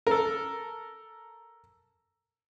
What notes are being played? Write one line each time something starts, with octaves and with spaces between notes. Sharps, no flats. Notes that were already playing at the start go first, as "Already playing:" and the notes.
A4 A#4